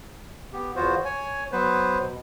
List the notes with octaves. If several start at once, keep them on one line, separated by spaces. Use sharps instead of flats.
B3 G4
E2 B3 F4 F#4 C5
C#5 G#5
F#3 B3 B4 C5
B2